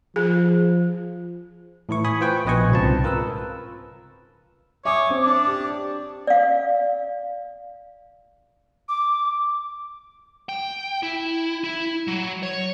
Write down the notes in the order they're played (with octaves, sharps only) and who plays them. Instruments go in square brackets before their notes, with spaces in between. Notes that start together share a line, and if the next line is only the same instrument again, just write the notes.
[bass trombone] F3 [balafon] G#4
[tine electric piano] A2 E3 E4 C#6
G#5 B5 D#6
F4 B4 C5 G5 C#6
A#1 B2 B4 D#5 G#5 C#6
C2 G#2 C#3 C4 F4 A5
F4 A#4 B4 E6
[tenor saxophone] C#5 [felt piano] E5 G#5 D#6 [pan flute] D6
[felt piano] C4
[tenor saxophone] D4
[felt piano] G4
[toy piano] D5 F5
[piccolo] D6
[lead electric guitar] G5
E4
E4
F#3
C#5